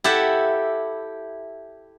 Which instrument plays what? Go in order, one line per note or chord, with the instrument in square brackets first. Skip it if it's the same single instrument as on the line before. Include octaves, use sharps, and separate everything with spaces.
[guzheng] E4 G4 A4 E5 F#5